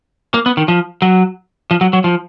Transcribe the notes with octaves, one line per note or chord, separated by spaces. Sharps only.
A#3
B3
D#3
F3
F#3
F3
F#3
F#3
F3